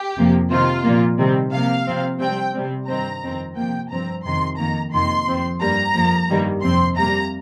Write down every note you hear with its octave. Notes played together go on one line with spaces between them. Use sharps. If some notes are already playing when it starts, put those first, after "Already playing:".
Already playing: G4
F2 C3 F3 A#3
C3 D#3 C4 F4
A#2 F3 A#3
C3 D#3 G3 C4
C3 F3 A#3 F5
C3 F3 C4
C3 G3 C4 G5
C3 G3 C4
G2 D#3 C4 A#5
F2 D#3 C4
C3 F3 A#3 G5
G2 F3 C4 A#5
F2 C3 D#3 C6
F2 D#3 A#3 A#5
F2 C3 D#3 A#3 C6
F2 F3 C4
G2 G3 A#3 A#5
F2 F3 A#3
G2 D#3 G3 A#3
F2 C3 F3 C4 C6
C3 G3 A#3 A#5